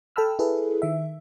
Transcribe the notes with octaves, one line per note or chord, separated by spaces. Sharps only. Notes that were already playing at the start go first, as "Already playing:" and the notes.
A4 G5 A5 B5 E6 F6
E4 G#4 A4 B4 E5
D#3 E5